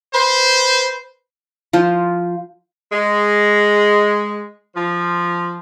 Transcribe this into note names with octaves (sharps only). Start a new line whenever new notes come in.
B4 C5
F3 F4 C5
G#3
F3